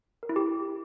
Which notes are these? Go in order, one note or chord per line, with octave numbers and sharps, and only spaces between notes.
A#4
E4
G4